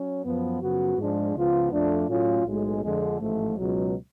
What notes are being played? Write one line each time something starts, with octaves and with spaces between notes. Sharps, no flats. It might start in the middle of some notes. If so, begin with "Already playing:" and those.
Already playing: F#3 C#4
F#2 F3 B3
F#2 C#3 F3 B3 F#4
G#2 F3 G#3 D4
C#2 C#3 F3 B3 F4
F2 F3 A3 D4
A2 F#3 C#4 F4
B1 A2 G#3
F2 D3 F3 G#3
A1 G#2 F3 A3
C#2 B2 F#3